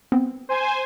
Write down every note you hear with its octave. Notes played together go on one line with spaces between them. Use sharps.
B3 C4
C5 G#5